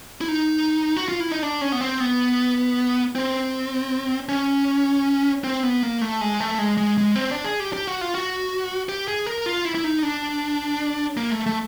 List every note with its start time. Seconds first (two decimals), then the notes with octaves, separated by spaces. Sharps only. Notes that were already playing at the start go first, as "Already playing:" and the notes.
0.21 E4
0.28 D#4
0.97 F#4
1.08 F4
1.20 E4
1.32 D#4
1.42 D4
1.61 C#4
1.72 B3
1.81 C4
2.00 B3
3.15 C4
4.29 C#4
5.44 C4
5.63 B3
5.83 A#3
6.02 A3
6.21 G#3
6.40 A3
6.58 G#3
6.77 G#3
6.98 G#3
7.16 C4
7.31 D4
7.44 G#4
7.60 G4
7.73 G4
7.87 F#4
8.01 F4
8.15 F#4
8.89 G4
9.08 G#4
9.27 A#4
9.46 F4
9.65 E4
9.75 E4
9.84 D#4
10.03 D4
11.17 A#3
11.31 A3
11.46 A3